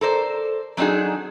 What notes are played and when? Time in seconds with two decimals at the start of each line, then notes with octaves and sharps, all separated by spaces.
0.01 A4 A#4 C5 D5
0.77 F#3 C4 D4 D#4 F#4 G#4